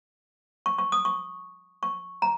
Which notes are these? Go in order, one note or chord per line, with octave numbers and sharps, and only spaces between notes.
C#6
C#6
D#6
C#6
C#6
A#5